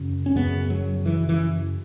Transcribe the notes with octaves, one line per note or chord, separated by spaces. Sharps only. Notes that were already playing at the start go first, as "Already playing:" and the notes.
Already playing: F#2 C#3
C#4
F#2 C#3 B3
F#3
E3
E3